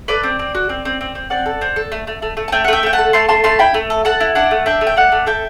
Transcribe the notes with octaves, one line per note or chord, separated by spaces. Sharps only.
A4 B4 D5
C4
C4
F#4
C4
C4
C4
C4
C4 D5 F#5
A4
C4
A4
A3
A3
A3
A3
A5
A3 E5 G5
F#5
A3 E5 G5
A3 G5
F#5 A5
A4
A3 A5 C6
A3 A5 C6
A3 A5 C6
E4 G5 B5
A3
A4
A4 F#5 A5
E4
D4 F#5 A5
A3
D4 E5 G5
A3
G5
A3 D5 F#5
A3
A4 E5 G5